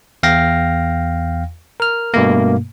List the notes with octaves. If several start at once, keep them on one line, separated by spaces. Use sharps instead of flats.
E2 F5 G5 A#6
A#4 F6
G2 B2 A3 A#3